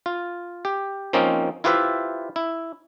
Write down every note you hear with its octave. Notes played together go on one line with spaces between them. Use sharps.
F4
G4
F3 A#3 C4 C#4 D#4
E4 F4 G4 B4 C5 E5
E4